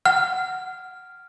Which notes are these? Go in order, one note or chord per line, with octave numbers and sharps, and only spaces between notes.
F#5 F6